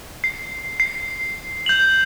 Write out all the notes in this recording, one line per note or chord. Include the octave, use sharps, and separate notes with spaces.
C7
C7
G6 F7 F#7